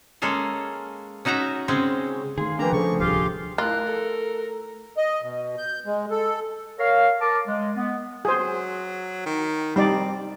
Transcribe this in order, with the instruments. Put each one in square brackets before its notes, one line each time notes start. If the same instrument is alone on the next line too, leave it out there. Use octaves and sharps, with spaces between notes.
[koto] G#3 A#3 C#4 A4 F5
C#4 D#4 F#4 E5 A#5
C#3 G#3 C4 C#4
[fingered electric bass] D#3 A3 [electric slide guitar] G#4 [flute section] F5 C6
[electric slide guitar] F3 D4 [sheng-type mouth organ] A#3 A#5 [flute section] B4 G5 G#5
[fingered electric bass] C#3 A3 [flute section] G#4 A4 C5 [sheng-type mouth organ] C#6
[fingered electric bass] D1 C2 [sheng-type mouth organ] F4 G4 F5 [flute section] G#4
[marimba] A3 E4 [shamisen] F4 [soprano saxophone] A#4 [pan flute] F#6
[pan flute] A4
[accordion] D#5
B2
G6
G#3
A4
[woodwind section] A#4 C#5 F5
A#4 A5 D6
G#3
B3
[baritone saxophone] F#3 [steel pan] G#4 C5
[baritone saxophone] D#3
[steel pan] G3 D#4 D5 [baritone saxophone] C4